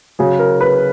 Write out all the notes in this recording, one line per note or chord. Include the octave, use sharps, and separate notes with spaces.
C#3 F#3 G#4
A#4
B4